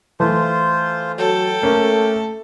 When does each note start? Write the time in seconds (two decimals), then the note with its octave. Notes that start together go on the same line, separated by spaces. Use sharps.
0.20 E3 A3 F4 C5
1.18 F#3 A4 G5
1.63 A3 A#3 C#4